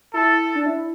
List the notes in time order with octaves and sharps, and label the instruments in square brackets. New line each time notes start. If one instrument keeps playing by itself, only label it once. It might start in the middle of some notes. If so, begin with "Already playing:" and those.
[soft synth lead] E4 [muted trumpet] A4
[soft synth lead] D4
E4